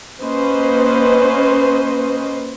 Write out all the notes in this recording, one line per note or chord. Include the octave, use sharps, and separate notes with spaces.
A#3 C#4 B4 C5 D#5